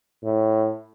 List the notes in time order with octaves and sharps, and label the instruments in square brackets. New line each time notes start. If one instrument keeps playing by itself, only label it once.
[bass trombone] A2